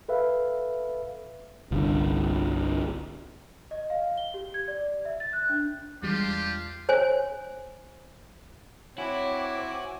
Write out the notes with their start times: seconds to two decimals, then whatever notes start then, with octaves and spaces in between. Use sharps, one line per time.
0.08 A4 B4 E5 F5
1.71 G1 C2 D3
3.71 D#5
3.90 F5
4.17 G7
4.34 G4
4.54 G#6
4.68 D5
5.05 E5
5.20 A6
5.33 F#6
5.49 D4
6.03 E2 G3 G#3 D4 F4 G4
6.89 C5 C#5 G#5
8.98 C4 E4 F#4 C#5 F#5 G#5 D6